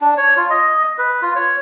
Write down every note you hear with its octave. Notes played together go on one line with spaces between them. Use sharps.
D4
C#5
F4
D#5
B4
F4
C#5